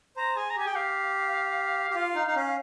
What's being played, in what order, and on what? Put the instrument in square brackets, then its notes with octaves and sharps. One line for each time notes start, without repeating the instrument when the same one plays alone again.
[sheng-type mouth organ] C5 [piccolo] A#5
[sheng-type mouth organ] G#4 [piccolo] G#5
[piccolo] A#5
[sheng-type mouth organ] G4 [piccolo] G#5
[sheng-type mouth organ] G#4 [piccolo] G5
[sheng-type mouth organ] G4 [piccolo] F5
[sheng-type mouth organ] G4
F4
D#4
D#4
C#4